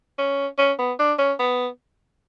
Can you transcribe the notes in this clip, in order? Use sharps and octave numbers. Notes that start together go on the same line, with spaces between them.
C#4
C#4
B3
D4
C#4
B3